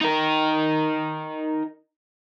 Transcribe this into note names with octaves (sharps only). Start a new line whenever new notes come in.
D#4 A#4